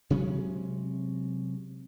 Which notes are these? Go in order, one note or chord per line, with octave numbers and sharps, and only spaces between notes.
C3 F#3 G#3 C#4